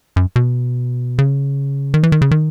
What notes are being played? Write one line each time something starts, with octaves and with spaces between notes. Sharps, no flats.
F#2
B2
C#3
D#3
E3
D#3
C#3
D#3